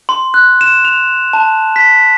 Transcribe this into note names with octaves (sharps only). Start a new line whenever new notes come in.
C6
F#6
E7
F7
A5
B6